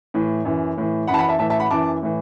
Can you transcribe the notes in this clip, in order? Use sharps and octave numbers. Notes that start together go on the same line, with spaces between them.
A2 E3
F#2 E3
A2 E3
F#2 E3 F#5 A5 B5
F#5 B5
E5 A5
A2 E3 E5 A5
E5 A5
F#5 B5
F#2 E3 A5 D6
A2 E3